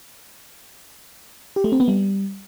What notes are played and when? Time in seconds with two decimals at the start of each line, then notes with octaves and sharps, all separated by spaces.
1.56 G4
1.64 A3
1.72 C4
1.80 B3
1.88 G3